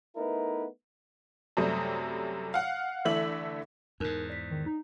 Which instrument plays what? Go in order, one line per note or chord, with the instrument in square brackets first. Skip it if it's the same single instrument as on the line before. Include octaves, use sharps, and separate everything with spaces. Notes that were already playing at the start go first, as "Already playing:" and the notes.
[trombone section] A3 B3 D#4 E4 A#4 B4
[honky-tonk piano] F#2 C3 G3 A3 D#6
F5 F#5
D3 E3 A3 E5 F#7
[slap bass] E2 G#2 [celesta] D#4 A#4 F#6
[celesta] D5 B6
[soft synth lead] D#3
D#4